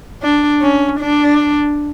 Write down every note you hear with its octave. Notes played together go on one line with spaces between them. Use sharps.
D4
C#4
D4